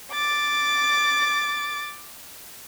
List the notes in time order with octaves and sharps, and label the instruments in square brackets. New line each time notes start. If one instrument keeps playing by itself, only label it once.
[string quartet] D6 A6